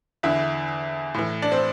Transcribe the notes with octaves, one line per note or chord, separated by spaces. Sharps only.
E2 D3 E4
A2 E3
D4
C4